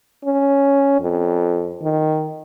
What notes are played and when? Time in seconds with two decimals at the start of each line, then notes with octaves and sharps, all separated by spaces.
0.25 C#4
1.01 F2
1.83 D#3